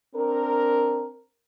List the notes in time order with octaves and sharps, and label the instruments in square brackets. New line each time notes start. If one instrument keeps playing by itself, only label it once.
[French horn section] C4 D4 A#4